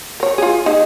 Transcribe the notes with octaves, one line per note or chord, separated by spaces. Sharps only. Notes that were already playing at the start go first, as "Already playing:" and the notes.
A#4 C#5
F4 G#4
D#4 G#4